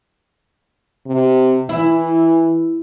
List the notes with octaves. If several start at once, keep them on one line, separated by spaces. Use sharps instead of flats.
C3
E3 E4